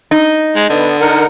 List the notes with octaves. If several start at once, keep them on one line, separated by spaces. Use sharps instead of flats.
D#4
G#3
D3 B3
D#4 A#4 F#5